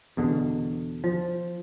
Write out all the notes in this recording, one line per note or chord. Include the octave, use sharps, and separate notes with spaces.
E2 B2 D3
F3